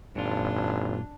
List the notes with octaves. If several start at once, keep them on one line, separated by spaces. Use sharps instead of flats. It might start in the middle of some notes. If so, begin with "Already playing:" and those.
G#1 F#2 A#2 D4 F4